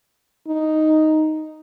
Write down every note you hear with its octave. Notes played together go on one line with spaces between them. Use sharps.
D#4